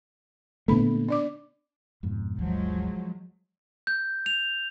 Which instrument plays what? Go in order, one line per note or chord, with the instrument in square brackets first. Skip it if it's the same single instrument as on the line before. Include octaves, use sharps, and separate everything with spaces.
[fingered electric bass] A#2 D3 A3 [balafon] B3 B5
[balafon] D4 D5 D6
[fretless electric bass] F2 G#2 B2
[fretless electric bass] G1 D2 [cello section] F3 F#3 G#3
[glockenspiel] G6
F7